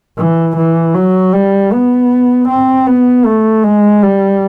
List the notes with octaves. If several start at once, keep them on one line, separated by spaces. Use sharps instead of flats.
E3
E3
F#3
G3
B3
C4
B3
A3
G#3
G3